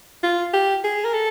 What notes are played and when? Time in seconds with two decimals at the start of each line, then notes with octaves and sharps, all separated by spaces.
0.23 F4
0.54 G4
0.84 G#4
1.05 A#4
1.13 A4